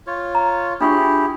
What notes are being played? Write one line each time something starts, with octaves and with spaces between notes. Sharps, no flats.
F4 C#5
A#5
D4 E4 F4 G4 G#4 C#6